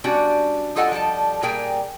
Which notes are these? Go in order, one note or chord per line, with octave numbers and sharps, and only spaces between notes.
G3 C#4 D4 F#4
G3 F4 A4 D#5 F#5 G#5
F3 G3 A4 A5
A#2 G3 G#4 A#4 G5 G#5